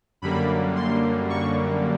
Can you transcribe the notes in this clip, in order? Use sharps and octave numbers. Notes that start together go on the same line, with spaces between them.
F#2 D3 G3 A#3 B5
C6
C#6